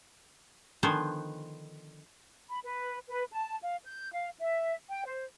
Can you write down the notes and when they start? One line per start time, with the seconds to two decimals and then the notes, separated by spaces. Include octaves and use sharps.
0.83 D3 D#3 F3 B3 C5 G#5
2.50 B5
2.65 B4
3.09 B4
3.32 A5
3.62 F5
3.85 G6
4.12 F5
4.39 E5
4.89 G5
5.05 C5